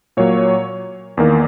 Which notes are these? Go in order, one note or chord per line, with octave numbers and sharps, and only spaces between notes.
A#2 F#3 A#3 C#5
E2 D#3 A#3